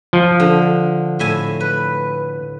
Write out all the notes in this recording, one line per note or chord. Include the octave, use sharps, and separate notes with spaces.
F3
D3
A2 E5 G#5
B4